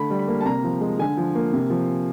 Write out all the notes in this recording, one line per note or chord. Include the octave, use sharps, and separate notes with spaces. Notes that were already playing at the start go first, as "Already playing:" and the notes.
Already playing: D3 A3 B5
G3
B5
A#3
A5
C3 A#5
F3
G#3
D3 G#5
F3
A#3
C3
F3